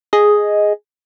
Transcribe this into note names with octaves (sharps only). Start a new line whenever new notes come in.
G#4 D#5